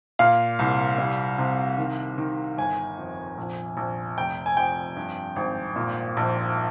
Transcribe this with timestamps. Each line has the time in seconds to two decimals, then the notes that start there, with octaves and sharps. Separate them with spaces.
0.19 A#2 F5
0.59 C2
0.98 G3
1.38 C3
1.78 D#3
2.18 D#3
2.57 G1 G#5
2.98 F2
3.37 A#1
3.77 A#1
4.17 F1 G5
4.46 G#5
4.57 F2 G5
4.96 G2
5.36 G#1
5.76 A#2
6.17 A#1